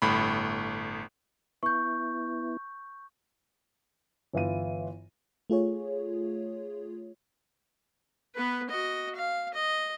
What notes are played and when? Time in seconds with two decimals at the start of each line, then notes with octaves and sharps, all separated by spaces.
0.02 G1 A2 B5
1.63 B3 E4 C#6 G6
4.33 G1 E3 E4 F4 D#7
5.50 A3 F4 G#4 C#5
8.36 B3 B4
8.70 F#4 D#5
9.16 F5
9.54 D#5